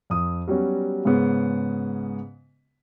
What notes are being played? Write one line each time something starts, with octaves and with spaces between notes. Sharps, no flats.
F2 D#6
F#3 G3 B3 C#4 F#4
G#2 C#3 G#3 B3 C#4